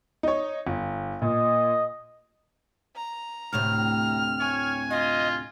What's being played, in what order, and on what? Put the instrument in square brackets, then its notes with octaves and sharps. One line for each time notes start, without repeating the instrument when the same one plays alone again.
[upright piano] D#4 C#5
G1
[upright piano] A#2 [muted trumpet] D#5
[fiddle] A#5
[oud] D2 A2 C3 [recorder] F6
[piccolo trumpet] C#5 [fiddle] G#5
[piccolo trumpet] F4 [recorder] D#5